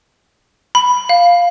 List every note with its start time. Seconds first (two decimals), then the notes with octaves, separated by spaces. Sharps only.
0.75 B5
1.09 F5